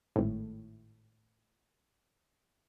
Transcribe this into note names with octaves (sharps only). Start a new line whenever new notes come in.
G#1 A2